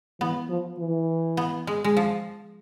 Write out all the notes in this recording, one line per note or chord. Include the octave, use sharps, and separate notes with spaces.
E3 B3
F3
E3
B3
G#3
G#3
F3